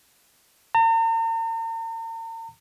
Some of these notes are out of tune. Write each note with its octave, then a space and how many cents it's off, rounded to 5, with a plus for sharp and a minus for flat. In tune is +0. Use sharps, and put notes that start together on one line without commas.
A#5 -45